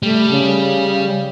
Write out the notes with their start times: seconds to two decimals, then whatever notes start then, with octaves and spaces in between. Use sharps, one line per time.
0.03 G3 A3
0.31 C#3